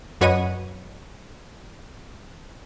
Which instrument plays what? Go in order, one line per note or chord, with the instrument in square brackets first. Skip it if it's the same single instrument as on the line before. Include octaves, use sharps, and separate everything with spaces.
[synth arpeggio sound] F#2 F#4 B4 C#5 D#5 D#7